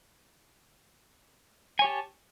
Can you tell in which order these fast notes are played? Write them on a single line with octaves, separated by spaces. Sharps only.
G#5 C#5 G4 A5